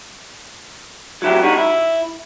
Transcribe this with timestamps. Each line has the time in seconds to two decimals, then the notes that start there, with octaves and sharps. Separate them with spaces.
1.22 F#3 E4 G4
1.42 G3 D#4 F#4
1.57 E4